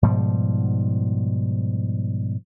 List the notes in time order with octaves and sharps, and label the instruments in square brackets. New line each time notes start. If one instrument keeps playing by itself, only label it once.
[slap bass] G#2 B2 F3 G3